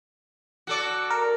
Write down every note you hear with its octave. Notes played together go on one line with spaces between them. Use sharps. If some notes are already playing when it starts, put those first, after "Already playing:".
F#4 A4 D5
A#4